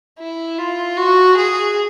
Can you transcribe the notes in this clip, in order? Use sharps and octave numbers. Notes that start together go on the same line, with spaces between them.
E4
F4
F#4
G#4